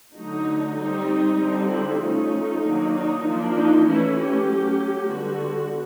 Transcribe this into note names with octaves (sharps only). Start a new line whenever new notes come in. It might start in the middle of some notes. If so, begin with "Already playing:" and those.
D3 F#3 A3 D#4
G3 C4 D#4
D3 G3 C4
E4
F3 A3 C#4 D#4
D#3 F#3 A#3 D4
D#4
F3 A#3 D4
D#4
E3 A3 C#4 E4
G4
F#3 A3 C#4
D3 G3 B3 F#4